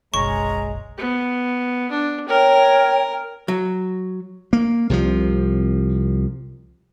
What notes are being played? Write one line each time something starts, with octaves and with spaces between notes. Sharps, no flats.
F#1 B1 G#3 C#4 C#5 A#5 C#6
B3
D4
A#4 C#5 G5
F#3
A#3
C2 C3 E3 F3